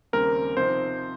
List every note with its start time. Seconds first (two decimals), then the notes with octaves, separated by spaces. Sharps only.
0.13 D#2 C#3 G3 C4 A#4
0.57 C3 F3 C4 D#4 C5